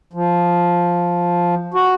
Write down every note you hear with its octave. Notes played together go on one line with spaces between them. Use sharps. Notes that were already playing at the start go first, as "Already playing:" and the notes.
F3
F#4